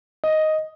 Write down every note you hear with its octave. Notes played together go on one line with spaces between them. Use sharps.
D#5